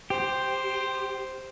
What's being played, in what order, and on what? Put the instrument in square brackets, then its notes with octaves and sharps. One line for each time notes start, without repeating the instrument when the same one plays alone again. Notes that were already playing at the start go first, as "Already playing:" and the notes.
[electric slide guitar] G4 [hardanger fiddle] C5